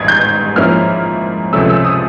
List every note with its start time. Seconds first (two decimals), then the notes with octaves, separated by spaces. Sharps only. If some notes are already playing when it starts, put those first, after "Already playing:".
Already playing: A1 G#2 D#3 G3 G#6
0.08 G6
0.56 G#2 F3 A#3 C#4 E4 F6
1.53 C#2 C3 F3 A3 C#4 E6
1.69 E6
1.85 D#6